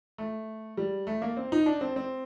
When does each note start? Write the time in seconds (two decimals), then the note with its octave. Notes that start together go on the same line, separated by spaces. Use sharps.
0.18 A3
0.77 G3
1.07 A3
1.22 A#3
1.37 C4
1.52 D#4
1.66 D4
1.81 C4
1.96 C4